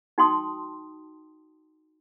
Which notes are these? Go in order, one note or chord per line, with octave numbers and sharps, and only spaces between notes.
D#4 F#4 G5 A5 C6 D#6